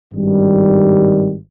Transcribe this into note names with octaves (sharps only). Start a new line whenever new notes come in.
G#1 G2 D#3 G3